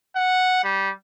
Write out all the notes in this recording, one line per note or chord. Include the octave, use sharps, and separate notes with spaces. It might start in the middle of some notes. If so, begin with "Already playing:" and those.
F#5
G3